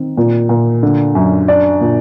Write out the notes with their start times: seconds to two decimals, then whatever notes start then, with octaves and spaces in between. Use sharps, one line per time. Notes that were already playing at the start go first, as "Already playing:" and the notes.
Already playing: D#3 C4
0.17 A#2
0.49 A#2
0.83 D3
1.15 F#2
1.48 D4 D5
1.81 A#2